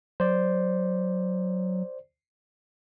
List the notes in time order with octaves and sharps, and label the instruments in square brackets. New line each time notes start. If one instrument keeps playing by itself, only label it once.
[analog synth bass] F#3 [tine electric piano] C5 D5